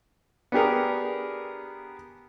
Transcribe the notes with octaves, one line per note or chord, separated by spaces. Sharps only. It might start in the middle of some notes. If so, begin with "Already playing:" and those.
B3 D4 G4 G#4 A#4